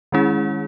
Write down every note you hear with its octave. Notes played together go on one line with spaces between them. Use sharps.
D#3 G#3 C#4 E4 G#4